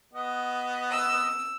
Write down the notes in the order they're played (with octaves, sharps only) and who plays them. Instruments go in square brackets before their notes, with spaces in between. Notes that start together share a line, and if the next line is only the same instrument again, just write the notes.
[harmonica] B3 F#4 D#5
[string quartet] E6